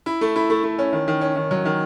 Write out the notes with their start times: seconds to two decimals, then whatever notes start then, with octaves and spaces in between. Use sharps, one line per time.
0.06 E4
0.21 A3
0.36 E4
0.50 A3
0.64 A3
0.79 C#4
0.93 D#3
1.08 D#3
1.21 C#4
1.36 D#3
1.51 F#3
1.65 D#3